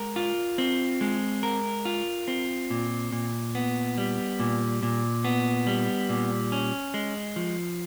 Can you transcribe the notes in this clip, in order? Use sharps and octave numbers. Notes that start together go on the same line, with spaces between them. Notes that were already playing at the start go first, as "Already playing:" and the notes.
Already playing: G#3 A#4
F4
C4
G#3
A#4
F4
C4
A#2
A#2
B3
G3
A#2
A#2
B3
G3
A#2
C#4
G#3
F3